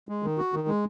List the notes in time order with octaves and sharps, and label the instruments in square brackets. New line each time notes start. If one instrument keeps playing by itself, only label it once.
[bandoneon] G#3
D#3
F#4
D#3
G#3